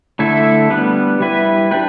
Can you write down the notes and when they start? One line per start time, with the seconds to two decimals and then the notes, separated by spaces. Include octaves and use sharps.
0.19 D3 A3 E4 A4
0.70 G3 B3 D4 B4
1.20 G3 E4 B4
1.71 D4 G4 B4